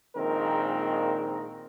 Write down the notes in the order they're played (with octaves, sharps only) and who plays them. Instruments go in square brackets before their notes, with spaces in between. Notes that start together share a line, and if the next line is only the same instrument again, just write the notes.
[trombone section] A#1 A#2 D#3 G#3 C4 A#4